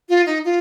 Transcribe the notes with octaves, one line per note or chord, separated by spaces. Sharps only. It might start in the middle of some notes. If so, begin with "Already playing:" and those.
F4
D#4
F4